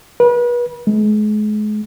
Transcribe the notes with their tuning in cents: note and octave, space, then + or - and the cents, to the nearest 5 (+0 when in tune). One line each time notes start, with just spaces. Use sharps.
B4 -35
G#3 +35